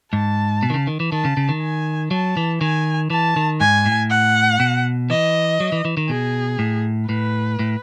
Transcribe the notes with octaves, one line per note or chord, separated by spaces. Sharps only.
G#2 A5
B2
D#3
C#3
D#3
E3
D#3 A5
C#3
C#3
D#3
G#5
F#3 A5
E3
D#3 G#5
E3 A5
D#3
G#2 G#5
A2
F#5
B2
E3 D#5
F#3
E3
E3
D#3
B2 G#4
A2
A2 B4
A2